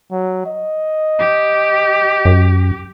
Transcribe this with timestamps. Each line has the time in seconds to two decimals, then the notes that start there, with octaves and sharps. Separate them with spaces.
0.11 F#3
0.46 D#5
1.19 G4
2.25 F#2